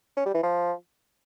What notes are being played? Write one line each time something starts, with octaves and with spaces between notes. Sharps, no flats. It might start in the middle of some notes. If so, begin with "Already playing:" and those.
C#4
G3
E3
F3